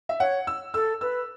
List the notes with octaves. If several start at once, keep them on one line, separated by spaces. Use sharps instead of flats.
E5
C#5 F#5
E6
A4 E6
B4 E6